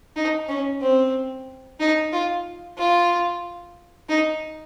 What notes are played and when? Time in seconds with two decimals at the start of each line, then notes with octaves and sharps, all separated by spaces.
0.16 D#4
0.48 C#4
0.82 C4
1.80 D#4
2.13 F4
2.78 F4
4.09 D#4